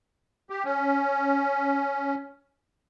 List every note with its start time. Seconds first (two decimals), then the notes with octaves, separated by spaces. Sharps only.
0.50 G4
0.65 C#4